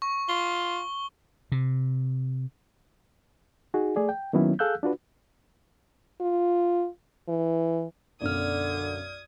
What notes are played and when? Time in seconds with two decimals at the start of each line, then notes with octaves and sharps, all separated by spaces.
0.02 C#6
0.29 F4 G7
1.52 C3
3.74 D#4 F#4 G#4
3.96 A3 G#4 D5
4.09 G5
4.33 D#3 F#3 A#3 B3 C#4 E4
4.59 G#4 A4 F5 E6 F#6 G6
4.83 D4 F4 F#4 B4
6.21 F4
7.29 E3
8.22 B1 F#2 D3 D5 D#6 F6 G#6